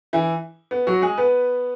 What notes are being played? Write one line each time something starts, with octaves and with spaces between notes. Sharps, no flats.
E3 E4
B3
F#3 F#4
G#3 G#4
B3 B4